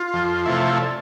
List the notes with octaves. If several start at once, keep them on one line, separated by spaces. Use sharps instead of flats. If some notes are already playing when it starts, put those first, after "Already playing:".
Already playing: F4
F2
C3 F3 A3 E4
D5